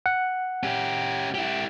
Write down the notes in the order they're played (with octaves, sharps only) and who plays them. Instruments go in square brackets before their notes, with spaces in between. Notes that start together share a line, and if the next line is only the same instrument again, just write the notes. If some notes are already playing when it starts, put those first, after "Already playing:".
[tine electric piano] F#5
[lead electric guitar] C#4 G4
E4 G4